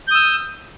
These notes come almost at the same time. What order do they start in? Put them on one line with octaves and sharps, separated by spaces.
G6 D#6 E6